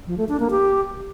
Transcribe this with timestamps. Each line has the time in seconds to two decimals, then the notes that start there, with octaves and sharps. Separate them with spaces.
0.07 F3
0.18 A3
0.29 D4
0.40 A#3
0.51 G4